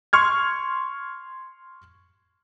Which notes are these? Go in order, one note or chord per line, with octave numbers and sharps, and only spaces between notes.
C6 C#6 F6 G#6